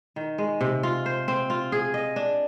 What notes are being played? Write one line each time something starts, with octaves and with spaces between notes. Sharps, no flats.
D#3
G#3
C3
F4
C5
C4
F4
G#4
D#5
D4